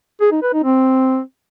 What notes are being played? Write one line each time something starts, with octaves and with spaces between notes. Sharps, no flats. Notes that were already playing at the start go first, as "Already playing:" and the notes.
G#4
D#4
B4
D#4
C4